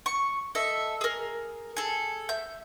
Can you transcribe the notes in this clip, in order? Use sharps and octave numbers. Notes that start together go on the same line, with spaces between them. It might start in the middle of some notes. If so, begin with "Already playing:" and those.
C#6
A4 D#5 E5
G#4 A#4
G#4 A4
E5 G6